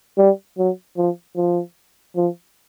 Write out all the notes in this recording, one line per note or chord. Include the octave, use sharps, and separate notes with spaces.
G3
F#3
F3
F3
F3